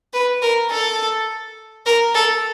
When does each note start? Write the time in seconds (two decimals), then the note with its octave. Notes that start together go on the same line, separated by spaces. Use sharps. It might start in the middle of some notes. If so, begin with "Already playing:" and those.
0.14 B4
0.42 A#4
0.71 A4
1.86 A#4
2.14 A4